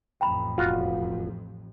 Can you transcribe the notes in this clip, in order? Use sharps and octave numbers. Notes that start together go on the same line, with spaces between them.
A1 F2 G5 A#5 B5
E1 F4 F#4